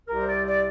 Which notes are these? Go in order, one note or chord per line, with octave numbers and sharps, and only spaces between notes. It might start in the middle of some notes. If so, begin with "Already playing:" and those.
C2 C3 G3 A#4
C5
D5
D5